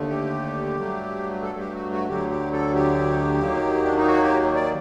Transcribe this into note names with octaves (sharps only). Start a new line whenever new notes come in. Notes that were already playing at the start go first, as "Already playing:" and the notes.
Already playing: D#2 D3 A3
G4
G2 F#3 A3
A4
G4
F#4
F#4
D2 D3 F#3 G4
G4
A4
G4
D#2 D#3 F#3 A#3
D4
D#4
F#4
G4
D5